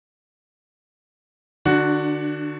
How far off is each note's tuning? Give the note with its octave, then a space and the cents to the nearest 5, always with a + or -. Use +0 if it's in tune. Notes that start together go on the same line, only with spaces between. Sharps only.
D3 +35 D4 +0 F#4 +0